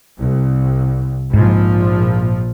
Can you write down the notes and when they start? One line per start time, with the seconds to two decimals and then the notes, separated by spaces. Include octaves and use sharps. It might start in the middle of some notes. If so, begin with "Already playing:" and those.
0.20 C2
1.34 A#1 G#2 F3